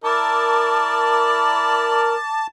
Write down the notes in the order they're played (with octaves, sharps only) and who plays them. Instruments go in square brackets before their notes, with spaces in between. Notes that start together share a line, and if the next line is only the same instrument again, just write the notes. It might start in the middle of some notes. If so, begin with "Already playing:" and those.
[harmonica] E4 D5 [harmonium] A#4 [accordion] A5 [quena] D6